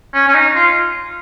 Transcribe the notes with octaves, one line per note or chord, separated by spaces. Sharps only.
C#4
C#4
D#4
F4